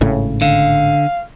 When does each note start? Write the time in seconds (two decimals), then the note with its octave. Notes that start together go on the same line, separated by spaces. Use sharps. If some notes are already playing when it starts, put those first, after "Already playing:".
0.01 G#1 A2 C#3
0.42 D3 F5